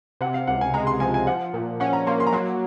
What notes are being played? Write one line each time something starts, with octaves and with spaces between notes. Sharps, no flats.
C3 F#5
F5
C#2 F#5
G#5
G#3 A#5
C6
F3 G#5
G#5
F3 F#5
A#2
C#4 F#5
A#5
A#3 C6
C6
A#5
F#3 C6